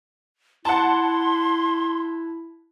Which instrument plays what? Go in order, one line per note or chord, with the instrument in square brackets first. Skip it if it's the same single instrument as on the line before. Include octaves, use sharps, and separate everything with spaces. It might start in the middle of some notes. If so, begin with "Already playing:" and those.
[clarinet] E4 [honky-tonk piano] F#5 A5 [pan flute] C6